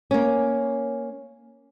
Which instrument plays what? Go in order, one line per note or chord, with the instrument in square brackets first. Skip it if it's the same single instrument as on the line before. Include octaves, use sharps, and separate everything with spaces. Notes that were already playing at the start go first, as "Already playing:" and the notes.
[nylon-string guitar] A#3 C#4